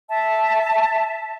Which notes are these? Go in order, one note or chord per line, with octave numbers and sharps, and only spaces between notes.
E5 A5